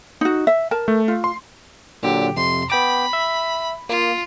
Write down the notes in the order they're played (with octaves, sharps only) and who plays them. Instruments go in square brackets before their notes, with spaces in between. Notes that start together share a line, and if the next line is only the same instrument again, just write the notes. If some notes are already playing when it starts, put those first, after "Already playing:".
[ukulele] D#4 F#4
E5
A#4 A5
[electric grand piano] A3
[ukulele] F4
[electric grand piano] C6
[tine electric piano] A#2 D3 F#3 [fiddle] G4
[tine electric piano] F2 C3 [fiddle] C6
[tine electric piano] B3 G5 D6 [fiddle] B5
[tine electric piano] E5
[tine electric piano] A#3 [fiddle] F4